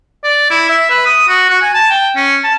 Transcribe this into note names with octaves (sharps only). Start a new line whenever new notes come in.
D5
E4
E5
B4
D#6
F#4
F#4
G#5
A5
G5
C#4
A5